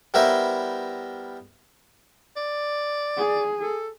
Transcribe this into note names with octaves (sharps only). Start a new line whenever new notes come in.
G3 B3 E4 A#4 C5 E5
D5
G#4
A4